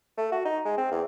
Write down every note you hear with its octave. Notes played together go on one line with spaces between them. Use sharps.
A3
F#4
D#4
G#3
C4
E2